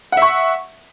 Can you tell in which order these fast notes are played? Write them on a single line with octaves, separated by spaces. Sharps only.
F#5 E5 C#6